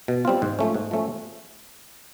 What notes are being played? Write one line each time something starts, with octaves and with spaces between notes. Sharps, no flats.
B2
G3 C4 F4
G#2
F3 A3 C#4
G#2
F3 A3 C#4